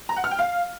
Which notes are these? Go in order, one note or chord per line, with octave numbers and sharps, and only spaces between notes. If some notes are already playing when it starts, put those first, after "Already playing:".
A#5
F#5
F6
G5
F5